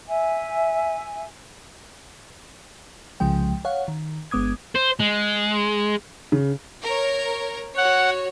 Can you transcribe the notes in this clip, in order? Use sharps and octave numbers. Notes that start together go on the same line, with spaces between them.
E5 G#5
C2 C#3 F3 G#3 G5
C#5 F5 F#5
D#3
G1 G#3 B3 D6 D#6 G#6
C5
G#3
C#3
A#4 C#5
F#4 C#5 F#5